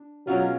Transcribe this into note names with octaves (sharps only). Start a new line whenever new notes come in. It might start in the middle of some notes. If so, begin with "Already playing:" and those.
Already playing: D4
B2 F#3 G#3 C#4 F4